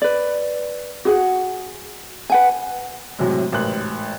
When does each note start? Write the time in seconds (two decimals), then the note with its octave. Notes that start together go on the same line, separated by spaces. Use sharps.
0.02 B4 D5
1.05 F#4 G#4 F#5
2.30 B4 F#5 G#5
3.19 F#2 A2 C3 F#3 G#3
3.52 A1 G#2 A#4 B4 F#6 F#7